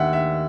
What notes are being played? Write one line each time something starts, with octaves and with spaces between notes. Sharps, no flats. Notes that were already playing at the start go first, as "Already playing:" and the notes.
Already playing: D#2 D#3 E5 F#5
E5